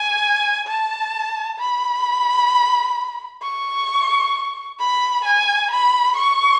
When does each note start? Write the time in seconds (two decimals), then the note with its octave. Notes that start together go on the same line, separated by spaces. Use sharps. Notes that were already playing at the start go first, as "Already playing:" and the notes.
Already playing: G#5
0.68 A5
1.59 B5
3.42 C#6
4.79 B5
5.25 G#5
5.71 B5
6.17 C#6